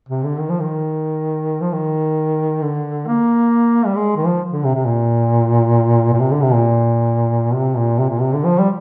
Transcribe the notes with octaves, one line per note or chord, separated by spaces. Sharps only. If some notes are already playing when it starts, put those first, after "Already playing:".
C3
D3
D#3
F3
D#3
F3
D#3
D3
A#3
G3
G#3
D#3
F3
D3
C3
C3
A#2
A#2
C3
D3
C3
A#2
C3
A#2
C3
A#2
C3
D3
F3
G3